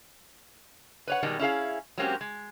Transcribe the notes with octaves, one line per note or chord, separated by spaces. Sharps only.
B4 C#5 F#5
B2 D#3 G3 G#3
C#4 E4 G#4 F5
F#3 G#3 A#3 C4 C#4 G4
G#3